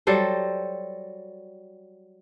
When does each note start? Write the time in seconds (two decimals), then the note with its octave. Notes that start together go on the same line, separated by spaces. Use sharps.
0.07 F#3 G3 A4 C5